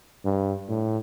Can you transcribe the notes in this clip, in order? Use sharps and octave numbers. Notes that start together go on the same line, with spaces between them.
G2
A2